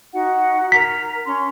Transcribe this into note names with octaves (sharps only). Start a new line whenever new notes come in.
D#4 F#4 F#5
A#4 A#5 B6
C#4 C6